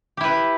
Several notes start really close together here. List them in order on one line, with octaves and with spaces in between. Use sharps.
G4 E4 B4